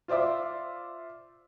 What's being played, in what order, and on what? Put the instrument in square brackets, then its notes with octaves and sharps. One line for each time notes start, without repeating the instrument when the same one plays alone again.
[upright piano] F4 C5 D5 E5 D6